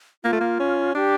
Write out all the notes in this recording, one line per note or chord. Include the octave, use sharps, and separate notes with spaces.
A#3 F4
A3
A#3
C#4
D4 G4